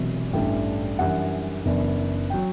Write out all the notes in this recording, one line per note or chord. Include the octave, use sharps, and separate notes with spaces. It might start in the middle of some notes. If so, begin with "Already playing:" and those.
Already playing: E1 E2 C3 F#3 B3
A1 G2 E3 A3 D4 G5
F#2 E3 G3 D4 F#5
F#1 F#2 E3 B3 D4
F#3 G5